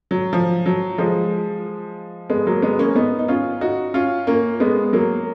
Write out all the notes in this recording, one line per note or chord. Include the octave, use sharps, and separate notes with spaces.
F#3
F3
F#3
F3 G#3
G#3 B3
F#3 A#3
G#3 B3
A#3 C#4
B3 D#4
D#4
C#4 F4
D#4 F#4
C#4 F4
A#3 C#4
G#3 B3
F#3 A#3